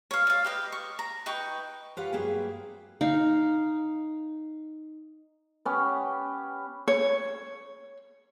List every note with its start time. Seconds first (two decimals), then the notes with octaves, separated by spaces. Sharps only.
0.11 C#5 F5
0.27 D5 F5
0.45 G4 B4 D#5
0.72 C#6
0.99 A#5
1.26 D#4 B4 G5 C#6
1.97 F4 G4 B4 C#5 F5 F#5
2.13 G2 F#3 A#3 G#4 B4 G5
3.01 D#4 F5
5.65 B3 C#4 G4
6.88 C#5